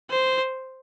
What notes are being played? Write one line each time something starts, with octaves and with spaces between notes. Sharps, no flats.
C5